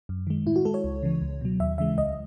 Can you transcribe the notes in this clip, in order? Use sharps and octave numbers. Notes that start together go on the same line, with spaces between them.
F#2
D#3 G#3
A2 E4
F#4
G#3 A4
C#5
C#2
C#3 E3
C#2
B2 F#3
D#2 E5
C#3 E3 G#3 E5
C#2 D#5